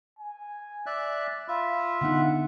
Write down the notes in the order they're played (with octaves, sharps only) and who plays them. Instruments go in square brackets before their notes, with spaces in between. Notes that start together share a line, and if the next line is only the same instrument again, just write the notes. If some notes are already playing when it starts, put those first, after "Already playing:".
[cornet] G#5
[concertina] D5 E5 F#6
[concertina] F4 E5 [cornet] B5
[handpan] D3 B3 D#4 [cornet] F#5